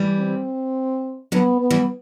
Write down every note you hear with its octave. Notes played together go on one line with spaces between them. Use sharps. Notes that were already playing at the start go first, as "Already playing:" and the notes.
Already playing: E3 G3
C4
D3 F#3 B3
B3
E3 G3